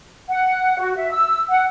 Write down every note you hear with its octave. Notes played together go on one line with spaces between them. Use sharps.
F#5
F#4
E5
E6
F#5